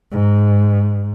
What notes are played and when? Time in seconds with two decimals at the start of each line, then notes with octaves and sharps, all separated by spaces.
0.12 G#2